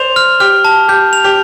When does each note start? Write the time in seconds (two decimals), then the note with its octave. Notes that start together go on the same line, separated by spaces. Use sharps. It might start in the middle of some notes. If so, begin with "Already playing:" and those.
Already playing: C5 D5 F7
0.16 F6
0.40 G4 F6
0.65 A5
0.88 G4 G6
1.13 F7
1.24 G4